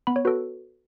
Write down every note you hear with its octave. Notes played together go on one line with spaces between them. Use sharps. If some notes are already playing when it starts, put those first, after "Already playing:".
B3 B5
C#5
F#4 A4 B4